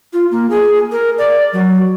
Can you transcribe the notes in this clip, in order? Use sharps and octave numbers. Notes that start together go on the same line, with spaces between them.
F4
A#3
G#4
A#4
D5
F#3